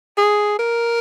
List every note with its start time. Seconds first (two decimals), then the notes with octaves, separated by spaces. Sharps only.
0.18 G#4
0.59 A#4